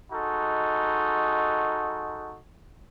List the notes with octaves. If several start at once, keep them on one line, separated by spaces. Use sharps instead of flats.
G#3 D#4 F#4 A4